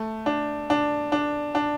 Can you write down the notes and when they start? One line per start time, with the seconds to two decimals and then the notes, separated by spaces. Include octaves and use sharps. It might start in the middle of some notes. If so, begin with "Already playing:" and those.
Already playing: A3
0.26 D4
0.70 D4
1.12 D4
1.55 D4